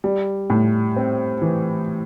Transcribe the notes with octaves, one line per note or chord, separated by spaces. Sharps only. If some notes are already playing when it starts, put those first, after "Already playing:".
G3
A2
C4
E3